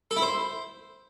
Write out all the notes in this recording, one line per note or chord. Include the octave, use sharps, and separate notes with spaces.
A4
E4
C5